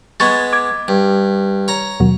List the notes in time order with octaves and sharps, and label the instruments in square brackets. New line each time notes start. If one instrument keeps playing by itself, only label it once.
[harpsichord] G#3 B3 [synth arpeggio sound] C#6 G#6 A6
[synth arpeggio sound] D6 G#6
[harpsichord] G2
C#5 A#5
[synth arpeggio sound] D#2 B2 F#3